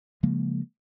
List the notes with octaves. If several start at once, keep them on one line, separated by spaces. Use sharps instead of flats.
C#3 F3 G#3 A#3